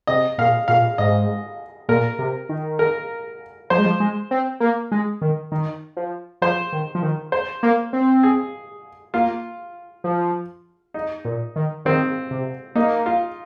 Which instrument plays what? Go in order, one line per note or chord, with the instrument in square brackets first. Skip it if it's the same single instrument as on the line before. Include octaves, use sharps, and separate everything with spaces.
[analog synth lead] C3 [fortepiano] D#5
[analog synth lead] A#2 [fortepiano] F5
[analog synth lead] A#2 [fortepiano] F5
[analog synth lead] G#2 [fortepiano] D#5
[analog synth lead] A#2 [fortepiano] A#4
[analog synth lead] C3
D#3
[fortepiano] A#4
[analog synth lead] F3 [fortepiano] C5
[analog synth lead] G#3
F3
G#3
C4
A#3
G#3
D#3
D#3
F3
[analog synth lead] F3 [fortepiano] C5
[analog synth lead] D#3
F3
D#3
[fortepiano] C5
[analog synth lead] A#3
C4
[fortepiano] G#4
[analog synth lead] A#3 [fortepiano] F4
[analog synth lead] F3
[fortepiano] D#4
[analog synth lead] A#2
D#3
[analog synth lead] D#3 [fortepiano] C4
[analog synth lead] C3
[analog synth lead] A#3 [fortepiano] D#4
[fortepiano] F4